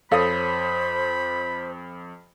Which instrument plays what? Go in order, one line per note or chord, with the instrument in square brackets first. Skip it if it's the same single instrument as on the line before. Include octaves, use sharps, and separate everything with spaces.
[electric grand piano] F2 D#6 [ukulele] A4 C#5 F5 [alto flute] C5 [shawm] B5